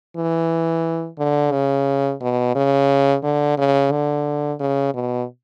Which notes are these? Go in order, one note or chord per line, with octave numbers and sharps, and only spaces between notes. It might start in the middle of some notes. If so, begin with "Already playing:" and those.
E3
D3
C#3
B2
C#3
D3
C#3
D3
C#3
B2